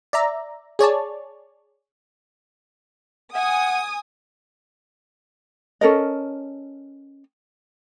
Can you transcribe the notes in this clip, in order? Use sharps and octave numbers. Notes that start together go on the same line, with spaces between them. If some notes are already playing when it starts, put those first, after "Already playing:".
D5 E5 A#5
G#4 C#5 D5 A5
F#5 G#5 D#6
C#4 A4 A#4 D#5